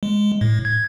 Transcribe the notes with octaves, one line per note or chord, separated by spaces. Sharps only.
G#3
A2
G#6